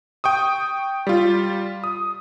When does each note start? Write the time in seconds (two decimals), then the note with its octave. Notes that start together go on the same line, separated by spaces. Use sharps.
0.24 G5 C#6 D#6
1.07 G3 F4
1.84 D#6